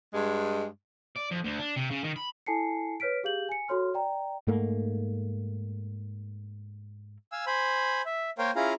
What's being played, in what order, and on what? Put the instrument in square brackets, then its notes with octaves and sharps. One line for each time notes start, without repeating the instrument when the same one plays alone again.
[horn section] G2 G#3
[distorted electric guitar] D5
F2
D2
D4
C3
C#3
D#3
B5
[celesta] E4 A4 G#5 A5 C7 C#7
B4 C#5 F6 B6 D7
G4 G#4 F5 G6 F#7
G#5 C#7
F#4 A4 C#5 C6 F6
D5 G5 A#5
[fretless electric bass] G#2 A3 A#3
[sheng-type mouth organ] F5 G#5 E6
C5 G#5 B5
E5
A#3 A#4 C5 C#5 F5 G5
C#4 E4 F4 G#4 F5 A#5